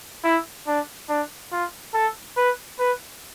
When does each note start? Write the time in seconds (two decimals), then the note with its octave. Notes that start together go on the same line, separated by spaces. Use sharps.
0.24 E4
0.67 D4
1.09 D4
1.52 F4
1.94 A4
2.37 B4
2.79 B4